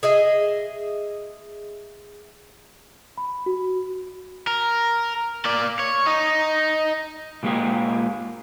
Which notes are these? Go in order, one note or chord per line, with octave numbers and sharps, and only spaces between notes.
G#4 D#5 E5
B5
F#4
A#4
A#3 D5
C#5
D#4
A#2 G#3 A#3 G4 G#4